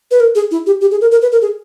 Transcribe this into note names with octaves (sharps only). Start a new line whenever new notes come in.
B4
A#4
G#4
E4
G4
G4
G#4
A#4
A#4
B4
A#4
G#4